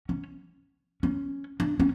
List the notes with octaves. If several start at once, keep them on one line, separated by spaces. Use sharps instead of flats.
C#4
C#4
D4
C#4